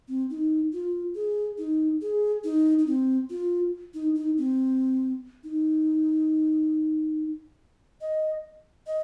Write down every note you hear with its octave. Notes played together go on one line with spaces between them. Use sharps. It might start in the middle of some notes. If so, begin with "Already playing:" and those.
C4
D#4
F4
G#4
D#4
G#4
D#4
D#4
C4
F4
D#4
D#4
C4
D#4
D#5
D#5